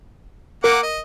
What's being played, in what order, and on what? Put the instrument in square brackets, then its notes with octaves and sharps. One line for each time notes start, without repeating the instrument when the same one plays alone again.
[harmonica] A#3 F#5 D6 [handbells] A#4
[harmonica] D#5